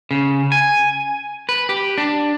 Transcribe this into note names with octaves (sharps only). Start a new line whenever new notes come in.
C#3
G#5
B4
G4
D4